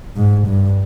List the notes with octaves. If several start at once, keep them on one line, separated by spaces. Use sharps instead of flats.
G#2
G2